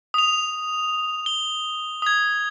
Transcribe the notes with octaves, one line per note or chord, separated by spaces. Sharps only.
D#6 F7
G7
D#6 G#6